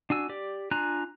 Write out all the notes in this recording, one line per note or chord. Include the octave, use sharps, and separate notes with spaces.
D4 F#4 G#5 E6
G4 D5
D4 F4 G#5 A#5 F#6